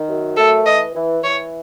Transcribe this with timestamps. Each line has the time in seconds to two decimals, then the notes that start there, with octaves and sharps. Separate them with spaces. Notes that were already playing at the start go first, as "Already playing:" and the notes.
Already playing: D#3
0.09 F#2
0.37 A3 A4
0.66 E3 D#5
0.94 E3
1.23 E3 C#5